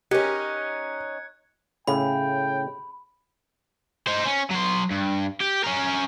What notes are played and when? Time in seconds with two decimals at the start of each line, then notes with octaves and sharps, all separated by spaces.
0.11 C#4 D#4 G4 A#4 F#6 G#6 C#7
1.87 A2 C#3 G5 B5
4.07 D#4 C5
4.26 C#4
4.50 F#3 C6
4.91 G2
5.40 G4
5.64 C#4 A#4